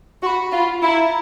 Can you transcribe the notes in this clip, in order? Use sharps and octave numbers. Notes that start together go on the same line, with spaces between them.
F#4 C#6
B5
F4
E4 B5
A#5